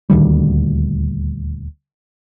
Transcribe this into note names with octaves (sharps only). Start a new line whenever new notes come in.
D#1 D2 D#3 G3